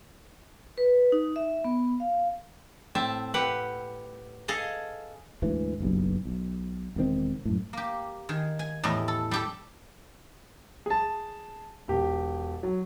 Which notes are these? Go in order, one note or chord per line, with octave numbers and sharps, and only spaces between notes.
B4
D#4
E5
B3
F5
A2 C4 E5 A5
G4 B4 F#5
G#4 A4 D#5 F5
D2 G#2 E3
F#1 B1 G2
B1
E1 C3 D#3 C4
F#2 A2
A#3 G4
D#3 G#4
G#5
E2 A2 G3 D#5
A4
G3 G4 A4
G#4 A5
E1 G4
F#3